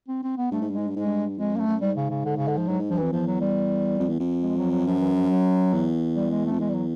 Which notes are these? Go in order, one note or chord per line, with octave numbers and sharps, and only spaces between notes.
C4
C4
B3
G2 A3
G#2
G2 G#3
G#2
G2
G#2 G#3
G2
F2 G#3
F#2 A#3
A3
F#2
G#2 G3
C#3
C#3
D3
C#3
D3
F3
G#2 F#3
G#2
G2 F3
F2 E3
E2 F3
F#3
G3
F2
E2
F2
G#3
F#3
F#3
F#2 F3
E3
F3
F#3
E2
G3
G#3
A3
F2
E2 G#3
G3
F#3